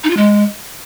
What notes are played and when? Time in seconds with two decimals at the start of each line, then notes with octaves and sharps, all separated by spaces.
0.04 D#4
0.10 F4
0.17 G#3